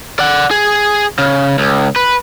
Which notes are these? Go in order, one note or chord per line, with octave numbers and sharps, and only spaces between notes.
D5 F#5
G#4
C#3
C#2
B4